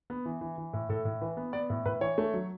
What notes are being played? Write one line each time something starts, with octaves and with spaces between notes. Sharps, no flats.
B3
E3
E3
E3
A2
A2 A4
A2
E3 B4
B3
B3 D5
A2
A2 B4
E3 C#5
A3
F#3